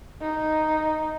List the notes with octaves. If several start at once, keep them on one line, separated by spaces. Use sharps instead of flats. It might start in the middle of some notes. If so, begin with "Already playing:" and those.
D#4